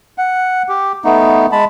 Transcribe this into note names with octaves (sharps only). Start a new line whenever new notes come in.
F#5
G4
A3 B3 D#4
G#3 A5 B5